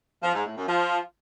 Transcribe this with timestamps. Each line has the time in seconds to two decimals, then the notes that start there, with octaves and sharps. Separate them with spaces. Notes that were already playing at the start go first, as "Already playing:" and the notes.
0.23 F3
0.34 G#2
0.46 A2
0.57 F#2
0.68 F3